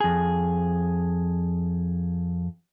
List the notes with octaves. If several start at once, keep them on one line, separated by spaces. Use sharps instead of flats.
F2 G#4